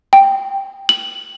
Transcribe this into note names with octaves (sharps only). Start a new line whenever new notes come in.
G5
F#7